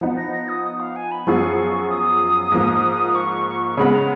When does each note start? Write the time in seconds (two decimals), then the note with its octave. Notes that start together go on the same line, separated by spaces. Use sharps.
0.01 F3 B3 D#4
0.17 A#6
0.33 A#6
0.49 D#6
0.64 D#6
0.80 F5
0.96 G#5
1.11 B5
1.27 F#2 F3 B3 F4 G#4 C#6
1.89 D#6
2.52 G#2 F3 A#3
3.15 C#6
3.77 C#3 G#3 B3 B5
3.93 A#5